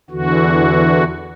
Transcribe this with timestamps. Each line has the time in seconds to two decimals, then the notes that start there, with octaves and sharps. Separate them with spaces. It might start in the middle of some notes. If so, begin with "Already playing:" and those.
0.10 E2 D3 E3 F#4